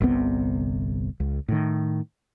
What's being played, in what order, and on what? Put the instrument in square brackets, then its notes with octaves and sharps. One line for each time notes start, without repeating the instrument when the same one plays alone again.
[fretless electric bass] G1 C2 C3 B3
C#2
A2 D#3